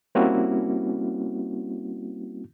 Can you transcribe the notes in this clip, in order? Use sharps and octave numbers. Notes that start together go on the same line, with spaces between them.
G3 A#3 C4 C#4 E4 F#4